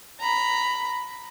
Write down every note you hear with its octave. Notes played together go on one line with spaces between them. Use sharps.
A#5 B5